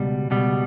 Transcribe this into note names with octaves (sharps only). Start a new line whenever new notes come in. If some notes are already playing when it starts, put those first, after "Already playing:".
Already playing: C#2 B2 G3
C#2 B2 G3